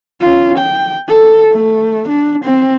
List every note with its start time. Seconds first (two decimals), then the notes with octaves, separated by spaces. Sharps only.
0.21 C#4 F4
0.58 G5
1.08 A4
1.52 A3
2.08 D4
2.44 C4